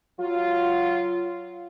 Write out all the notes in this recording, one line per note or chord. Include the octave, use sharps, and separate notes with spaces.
F#3 F4